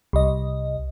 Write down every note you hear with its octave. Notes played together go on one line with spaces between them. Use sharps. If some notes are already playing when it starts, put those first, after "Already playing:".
C2 D#5